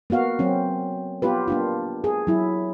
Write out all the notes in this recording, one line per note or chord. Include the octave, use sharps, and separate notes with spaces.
A#3 B3 F#4 F5
F#3 C4 C#4
B3 F4 G4 B4
A#3 D4 F4
G#4
F#3 E4